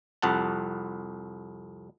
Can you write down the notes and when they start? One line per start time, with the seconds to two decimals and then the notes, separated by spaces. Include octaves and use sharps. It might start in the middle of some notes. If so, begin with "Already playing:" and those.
0.22 C2 F2 F#5 A5